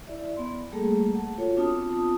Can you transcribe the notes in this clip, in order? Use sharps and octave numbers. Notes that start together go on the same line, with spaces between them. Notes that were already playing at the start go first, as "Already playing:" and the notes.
E4 D5 E5
B3 C6
G3 A3 A#3 G#4 A4
F#5 A5
F4 F#4 A4 C#5
B3 C4 D4 F4 A5 D#6